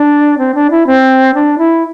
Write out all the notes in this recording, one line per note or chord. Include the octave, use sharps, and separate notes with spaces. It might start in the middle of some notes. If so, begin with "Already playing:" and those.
Already playing: D4
C4
D4
E4
C4
D4
E4